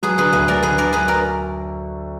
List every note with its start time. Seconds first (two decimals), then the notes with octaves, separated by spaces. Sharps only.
0.03 F#3 G#4 B4
0.18 D3 G#4 B4
0.33 D2 G#4 B4
0.48 D2 A#4 D5
0.63 D3 G#4 B4
0.78 D3 A#4 D5
0.93 F#3 G#4 B4
1.08 A#4 D5